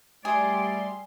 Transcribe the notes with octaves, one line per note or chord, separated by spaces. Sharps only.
G3 A3 G#4 D5 C6